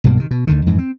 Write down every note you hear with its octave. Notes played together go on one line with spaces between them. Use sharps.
B1 G2 B2 A#3
C3 D#3
B2
D2 D3 D#3
F2 G#2 E3
C4